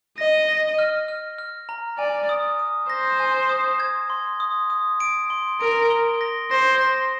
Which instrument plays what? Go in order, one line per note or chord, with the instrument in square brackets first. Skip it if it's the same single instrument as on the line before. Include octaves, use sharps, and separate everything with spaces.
[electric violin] D#5 [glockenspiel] A#6
[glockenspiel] A#6
F6
F6
F6
A#5
[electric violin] D5 [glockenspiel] G#5
[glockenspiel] D#6
D#6
[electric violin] C5 [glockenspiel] A#6
[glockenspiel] G#5
D#6
G#6
C6
D#6
D#6
D7
C6
[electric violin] A#4 [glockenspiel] D7
[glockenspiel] G7
A#6
[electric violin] C5 [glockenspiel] A#6
[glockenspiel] A#6